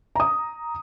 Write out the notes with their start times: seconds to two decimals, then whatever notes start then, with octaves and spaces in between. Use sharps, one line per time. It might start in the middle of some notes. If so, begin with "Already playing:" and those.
0.16 A#5 D#6